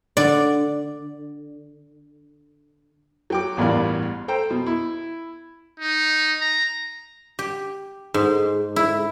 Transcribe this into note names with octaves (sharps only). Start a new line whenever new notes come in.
D3 D5
F#3 G5 D6
A1 E2 G2 F4 A#4 D5
A4 C5 G5 A#5
B2
E4
D#4
A#5
G4
G#2
E4